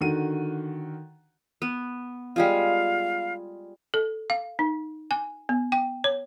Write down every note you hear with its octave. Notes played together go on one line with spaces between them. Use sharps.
D3 D#3 F#4 D#7
B3
G3 G#3 F4 F5
A4
F5
D#4
G#5
B3
G5
C#5